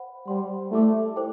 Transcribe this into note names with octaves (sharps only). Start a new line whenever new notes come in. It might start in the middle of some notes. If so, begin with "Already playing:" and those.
Already playing: C5 F#5 B5
G3 C5 F#5 C6
A3 E4 G4 D5 A5 D6
E4 A4 C5 G5 D6